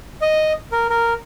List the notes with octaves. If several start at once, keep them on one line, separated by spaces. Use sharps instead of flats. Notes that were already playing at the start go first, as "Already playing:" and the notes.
D#5
A#4
A#4